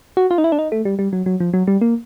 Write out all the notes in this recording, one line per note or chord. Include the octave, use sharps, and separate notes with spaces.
F#4
F4
D#4
E4
D4
D#4
A3
G3
G3
F#3
F#3
F3
F#3
G3
A#3